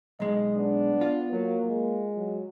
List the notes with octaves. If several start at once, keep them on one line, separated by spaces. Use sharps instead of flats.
B1 G#3 D#5
B3 D4
F4
F#3 A#3
G#3
F#3